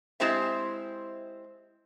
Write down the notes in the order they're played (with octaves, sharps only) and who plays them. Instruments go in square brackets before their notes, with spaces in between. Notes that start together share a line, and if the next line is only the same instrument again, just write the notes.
[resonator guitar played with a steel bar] G#3 C4 E4 G4 C5 E5